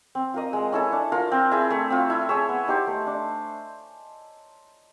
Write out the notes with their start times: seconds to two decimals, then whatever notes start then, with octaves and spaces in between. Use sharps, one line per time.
0.15 C4
0.34 F4 A#4 D#5
0.53 G#3
0.72 C#4 E4 A4
0.92 D4
1.12 F4 A#4
1.32 C4
1.51 E4 G#4
1.70 A3
1.90 C4 F4
2.10 E4
2.29 G#4 C#5 E5
2.49 B3
2.68 D#4 G4 C5
2.87 A3
3.07 D4